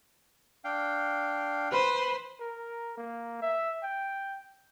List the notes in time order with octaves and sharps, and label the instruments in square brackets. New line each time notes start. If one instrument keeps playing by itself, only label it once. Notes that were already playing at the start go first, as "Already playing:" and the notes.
[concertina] D4 F5 G5
[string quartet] B4 [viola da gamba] C5
[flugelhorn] A#4
A#3
E5
G5